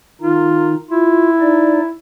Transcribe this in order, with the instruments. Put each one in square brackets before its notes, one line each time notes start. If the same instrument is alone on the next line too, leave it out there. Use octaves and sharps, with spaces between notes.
[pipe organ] D#3 D#4 [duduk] F4
[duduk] E4 [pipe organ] F4
[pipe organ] D#4 D5